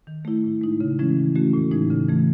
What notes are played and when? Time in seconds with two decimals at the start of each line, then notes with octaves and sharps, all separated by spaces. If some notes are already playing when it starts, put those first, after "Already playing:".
0.07 D#3
0.25 A3 E4
0.44 A2
0.61 G#3 D#4
0.81 C#3
0.99 E3 G#3 C#4 E4
1.17 D#3
1.35 A3 C#4 F#4
1.54 A2
1.71 E3 G#3 D#4
1.90 C#3
2.09 E3 A3